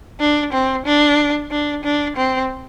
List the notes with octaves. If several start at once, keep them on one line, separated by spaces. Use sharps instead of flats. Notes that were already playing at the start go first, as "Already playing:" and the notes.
D4
C4
D4
D4
D4
C4